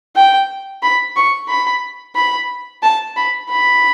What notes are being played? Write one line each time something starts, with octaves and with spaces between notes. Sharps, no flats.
G5
B5
C#6
B5
B5
A5
B5
B5